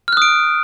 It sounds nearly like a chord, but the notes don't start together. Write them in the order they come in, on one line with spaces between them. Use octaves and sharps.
F6 F#6 D#6 D7